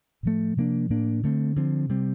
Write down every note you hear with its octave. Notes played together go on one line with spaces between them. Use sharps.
A2 F3 A3
C3 F3 A#3 D4
A2 F3 A#3 D4
D3 A3 C4
D3 F3 C4
C3 G3 C4